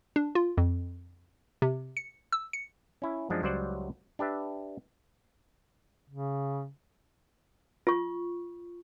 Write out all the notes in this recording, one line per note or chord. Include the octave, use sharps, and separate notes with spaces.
D4
F4
F2
C3
C#7
E6
C#7
C#4 E4
F#2 F3 G#3 D4
C#2 F#3 G3 C5 D5 F#5
D4 G4 B4 E5
C#3
F4 C#6